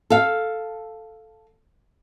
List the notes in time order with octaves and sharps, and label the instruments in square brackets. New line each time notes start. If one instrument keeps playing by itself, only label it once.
[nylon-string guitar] A4 F5